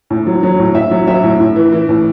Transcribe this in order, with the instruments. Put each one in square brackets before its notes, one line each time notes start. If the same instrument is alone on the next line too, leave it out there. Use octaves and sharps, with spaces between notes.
[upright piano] A2
F#3
F#3
A2
A2 E5
F#3
F#3 E5
A2
A2
E3
E3
A2